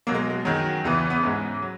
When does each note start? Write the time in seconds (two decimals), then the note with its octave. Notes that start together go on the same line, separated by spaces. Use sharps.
0.07 B2 F#3 A#3
0.15 G#3
0.30 G#3
0.45 F#2 D#3 F#3
0.84 E2 C#3 E3 B3
1.10 B3
1.23 G#2 E3 G#3 C#4
1.62 F#3